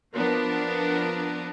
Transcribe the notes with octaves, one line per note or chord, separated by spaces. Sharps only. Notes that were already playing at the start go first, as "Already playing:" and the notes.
F3 B3 D4 A#4